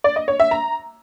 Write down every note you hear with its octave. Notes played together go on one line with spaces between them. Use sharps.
D5
D#5
C#5
E5
A#5